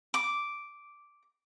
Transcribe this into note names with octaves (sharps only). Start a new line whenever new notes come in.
D6